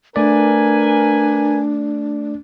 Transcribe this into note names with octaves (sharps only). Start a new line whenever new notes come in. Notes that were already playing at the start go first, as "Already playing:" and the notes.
A3 D4 A#4 B4 D5 G#5